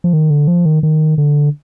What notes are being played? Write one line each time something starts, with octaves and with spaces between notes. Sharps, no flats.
F3
D#3
D3
F3
D#3
D#3
D3